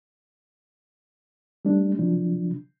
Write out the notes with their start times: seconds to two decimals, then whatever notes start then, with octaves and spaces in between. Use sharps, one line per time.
1.65 G3 A3 D4
1.99 C3 F3 F#3 D4